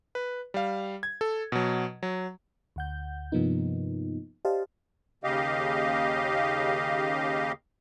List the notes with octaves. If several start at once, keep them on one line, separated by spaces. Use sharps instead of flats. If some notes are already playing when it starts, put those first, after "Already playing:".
B4
G3 F5
G#6
A4
B2 F#3
F#3
D2 F#5 G6
G2 C3 F3 A#3 B3 D#4
G4 C5 D5 D#5 F5 A5
D#2 C#3 G4 D#5 F5